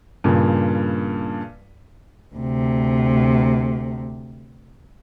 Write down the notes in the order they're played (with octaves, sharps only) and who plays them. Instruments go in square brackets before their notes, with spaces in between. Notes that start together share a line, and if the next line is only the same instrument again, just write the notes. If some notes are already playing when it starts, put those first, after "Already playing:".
[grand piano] G2 A#2 C#3
[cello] D2 C3